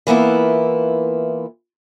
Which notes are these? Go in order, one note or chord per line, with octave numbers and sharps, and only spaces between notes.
E3 A#3 B3 E4 F4